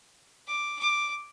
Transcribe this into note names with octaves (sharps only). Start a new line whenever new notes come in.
D6
D6